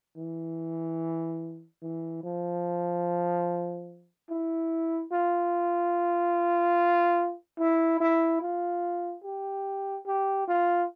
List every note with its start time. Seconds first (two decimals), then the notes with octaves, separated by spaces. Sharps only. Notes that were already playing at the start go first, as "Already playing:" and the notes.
0.17 E3
1.82 E3
2.23 F3
4.30 E4
5.12 F4
7.59 E4
8.00 E4
8.41 F4
9.24 G4
10.06 G4
10.48 F4